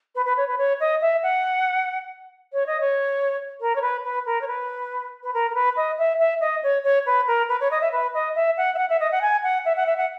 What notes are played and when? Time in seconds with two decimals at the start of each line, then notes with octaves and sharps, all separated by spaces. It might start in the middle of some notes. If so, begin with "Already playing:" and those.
0.15 B4
0.25 B4
0.37 C#5
0.48 B4
0.58 C#5
0.80 D#5
1.01 E5
1.23 F#5
2.53 C#5
2.66 D#5
2.80 C#5
3.60 A#4
3.75 C#5
3.82 B4
4.04 B4
4.26 A#4
4.41 C#5
4.47 B4
5.23 B4
5.34 A#4
5.51 A#4
5.54 B4
5.76 D#5
5.98 E5
6.19 E5
6.40 D#5
6.63 C#5
6.84 C#5
7.06 B4
7.27 A#4
7.49 B4
7.60 C#5
7.71 D#5
7.81 E5
7.92 B4
8.14 D#5
8.35 E5
8.57 F#5
8.74 E5
8.78 F#5
8.89 E5
9.00 D#5
9.11 F#5
9.21 G#5
9.43 F#5
9.65 E5
9.76 F#5
9.86 E5
9.97 F#5